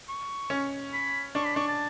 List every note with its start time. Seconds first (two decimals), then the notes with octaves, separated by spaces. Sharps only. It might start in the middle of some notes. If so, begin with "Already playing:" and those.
0.09 C#6
0.50 C#4
0.93 B5
1.35 D4 C#6
1.46 B5
1.56 D4 C#6
1.68 A5